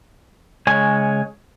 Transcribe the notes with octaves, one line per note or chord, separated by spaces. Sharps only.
C#3 G#3 C#5 G#5